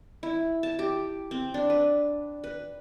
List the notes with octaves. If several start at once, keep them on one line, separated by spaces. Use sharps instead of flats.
E4
A5
G4
C4
D4
B4
B4